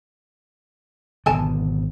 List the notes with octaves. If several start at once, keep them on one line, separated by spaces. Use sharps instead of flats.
G#1 B2 D3 A4 G#5 A5